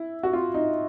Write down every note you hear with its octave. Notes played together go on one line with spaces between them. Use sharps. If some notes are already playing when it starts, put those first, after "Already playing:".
Already playing: E4
F#4
F4
D#4